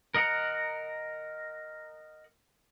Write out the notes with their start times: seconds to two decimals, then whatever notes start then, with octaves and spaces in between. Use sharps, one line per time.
0.14 A#4 D#5 F#5 A#5